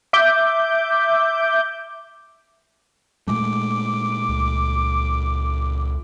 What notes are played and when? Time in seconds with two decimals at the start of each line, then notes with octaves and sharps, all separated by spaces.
0.13 E5 D6 G6
3.27 A#2 G#3 A3 D6
4.29 C#2